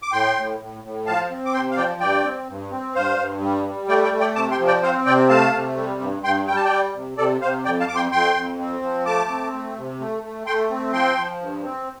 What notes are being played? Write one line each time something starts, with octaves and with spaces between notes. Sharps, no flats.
D6
A2 G5 C6
A2
A2
A2
F3 F5 A5
C4
D6
C3 G5 C6
F5
F3 D5 G5
G2 D5 G5
C4
G2
C4
G2 C5 F5
G2
G3
G3
A3 D5 G5
D5 G5
A3
D5 G5
C3 A5 D6
G5 C6
F3
D5 G5
C4 C5 F5
C3 D5 G5
A3 F5 A5
C3
G3
G2
G2 G5 C6
G3 G5
A5
D5 G5
G3
C3
C3 A4 D5
C3 C5 F5
F2 D5 G5
F5 A5
F2 D6
G5 C6
F2 G5 C6
F2
C4
F3
A3 A5 D6
C4
A3
C3
A3
A3
A3 G5 C6
C4
F3 G5 C6
F3
G2
C4